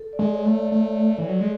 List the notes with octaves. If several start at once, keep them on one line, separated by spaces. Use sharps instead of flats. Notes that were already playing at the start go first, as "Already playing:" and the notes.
Already playing: A4
D5
G#3
C#5
A3
D5
A3
E3
F#3
G#3